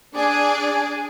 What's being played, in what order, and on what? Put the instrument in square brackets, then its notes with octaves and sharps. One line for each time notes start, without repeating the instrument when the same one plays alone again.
[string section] D4 G#4 D5 [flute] G#5